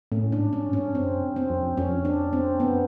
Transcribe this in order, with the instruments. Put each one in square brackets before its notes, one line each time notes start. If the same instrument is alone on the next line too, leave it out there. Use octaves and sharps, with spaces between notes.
[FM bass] A2 [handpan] C#4
[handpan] D4
[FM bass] G#2
[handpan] C#4
[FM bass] G2
[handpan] C#4
[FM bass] F#2 [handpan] C4
[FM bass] F2
[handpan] C4
[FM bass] F2
[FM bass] F2 [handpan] C#4
[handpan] D4
C4
[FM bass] F#2 [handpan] B3